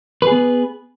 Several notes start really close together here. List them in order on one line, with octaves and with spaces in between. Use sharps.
B4 G#4 B3